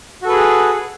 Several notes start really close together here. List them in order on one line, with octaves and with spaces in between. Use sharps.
F#4 A4 B4 G#4